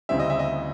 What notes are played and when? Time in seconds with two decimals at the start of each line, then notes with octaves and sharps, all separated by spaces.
0.09 D2 C#3 E3 G3 C4 E5
0.19 D#5
0.30 E5
0.39 D#5